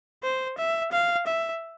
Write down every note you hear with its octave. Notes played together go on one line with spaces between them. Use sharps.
C5
E5
F5
E5